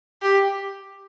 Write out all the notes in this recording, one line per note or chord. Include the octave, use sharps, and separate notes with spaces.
G4